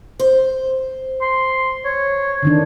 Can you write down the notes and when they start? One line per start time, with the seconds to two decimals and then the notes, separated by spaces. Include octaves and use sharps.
0.19 C5
1.21 C6
1.85 C#5
2.43 D3 D#3 D4